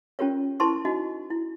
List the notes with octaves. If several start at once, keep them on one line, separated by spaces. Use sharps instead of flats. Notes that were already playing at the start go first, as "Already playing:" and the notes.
C#4 F4 G4 A#4 C#5
E4 A#4 C5 A5 C6 C#6
D#4 F#4 D#5
E4